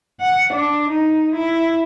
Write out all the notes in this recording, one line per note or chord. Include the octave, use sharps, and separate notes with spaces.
F#5
D4
D#4
E4